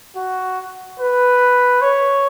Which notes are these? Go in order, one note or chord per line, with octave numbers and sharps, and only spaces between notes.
F#4
B4
C#5